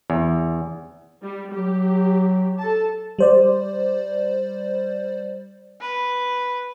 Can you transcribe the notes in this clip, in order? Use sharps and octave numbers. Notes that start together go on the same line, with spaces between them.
E2
G3
F#3 G4
A4 A5
G3 C5 D5
B4